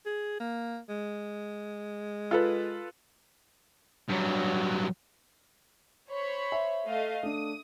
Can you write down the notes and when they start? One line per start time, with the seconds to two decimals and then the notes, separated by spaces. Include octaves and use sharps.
0.06 G#4
0.40 A#3
0.89 G#3
2.31 F4 A4 B4
4.09 G2 F#3
6.10 C5 C#5 B5
6.52 E5
6.85 A3 D#5 F5
7.23 A3 D4 D#6